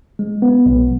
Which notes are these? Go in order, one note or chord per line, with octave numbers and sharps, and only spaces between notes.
G#3
B3
B1